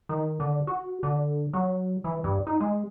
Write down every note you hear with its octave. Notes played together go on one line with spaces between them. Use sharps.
D#3
D3
F#4
D3
F#3
E3
G2
D#4
G#3